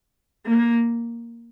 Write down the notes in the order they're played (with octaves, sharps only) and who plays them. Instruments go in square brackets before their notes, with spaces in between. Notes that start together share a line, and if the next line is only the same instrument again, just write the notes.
[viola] A#3